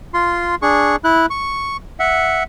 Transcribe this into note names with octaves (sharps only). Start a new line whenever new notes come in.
F4 C6
D4 G#4 C#6
E4 F#6
C#6
E5 F#5